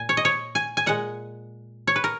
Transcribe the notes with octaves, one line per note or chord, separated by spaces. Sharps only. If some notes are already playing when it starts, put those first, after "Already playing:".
Already playing: A#2 G#5
C#5
D#5
C#5
G#5
G#5
A#2 G#3 F#5
C#5
B4
A#4